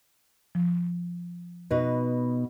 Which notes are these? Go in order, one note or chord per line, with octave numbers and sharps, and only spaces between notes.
F3
B2 D#4 B4